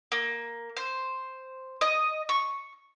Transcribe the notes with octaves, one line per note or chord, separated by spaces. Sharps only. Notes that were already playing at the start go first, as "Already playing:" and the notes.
A#3
C5
D#5
C#6